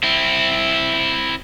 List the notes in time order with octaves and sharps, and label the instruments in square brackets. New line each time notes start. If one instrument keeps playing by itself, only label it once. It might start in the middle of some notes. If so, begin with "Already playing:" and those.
[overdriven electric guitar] C4 E4